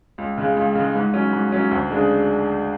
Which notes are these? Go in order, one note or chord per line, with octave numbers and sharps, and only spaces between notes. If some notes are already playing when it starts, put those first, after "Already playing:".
C#2
C#3 G#3
C#2
C#3 G#3
G#2
F#3 C#4
G#2
F#3 C#4
D2
C#3 G#3 D4 G#4